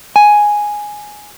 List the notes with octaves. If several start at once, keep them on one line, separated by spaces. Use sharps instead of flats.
G#5